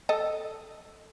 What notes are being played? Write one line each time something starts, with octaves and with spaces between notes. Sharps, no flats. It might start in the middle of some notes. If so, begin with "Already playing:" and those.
A4 D#5